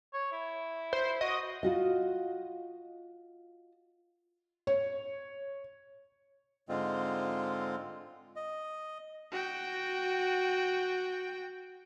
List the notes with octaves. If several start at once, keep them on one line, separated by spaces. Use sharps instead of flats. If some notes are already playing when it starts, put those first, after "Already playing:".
C#5
E4
C5
F#4 D#5
F4 F#4 D#5
C#5
G#2 D3 G#3 C4 F4
D#5
F#4 G5